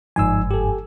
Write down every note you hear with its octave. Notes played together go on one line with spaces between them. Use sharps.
G1 G#2 F3 D#4 G#5 E6
G4 A4